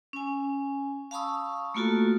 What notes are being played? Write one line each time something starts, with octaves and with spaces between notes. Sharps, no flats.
C#4 G#5
F5 A5 B5 C#6 D#6 E6
A3 A#3 F4 F#4 A4